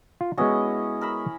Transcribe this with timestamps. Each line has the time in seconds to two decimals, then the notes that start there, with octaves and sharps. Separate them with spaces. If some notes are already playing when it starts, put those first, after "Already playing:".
0.21 F4
0.38 G#3 B3 C#4 E4 F#4 D#5
1.01 A#4 B5 E6